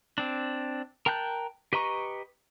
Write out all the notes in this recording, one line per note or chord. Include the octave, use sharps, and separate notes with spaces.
C4 D4
A#4 G5 A5 F#6 G6
G4 B4 D#5 A#5 C#6